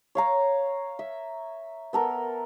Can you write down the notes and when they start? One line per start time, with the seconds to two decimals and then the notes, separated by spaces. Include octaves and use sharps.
0.15 C#5 F5 A#5
0.99 E5
1.93 B3 A4 A#4